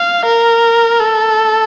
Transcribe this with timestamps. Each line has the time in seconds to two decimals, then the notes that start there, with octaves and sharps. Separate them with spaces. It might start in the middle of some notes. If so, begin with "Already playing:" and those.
Already playing: F5
0.25 A#4
1.01 A4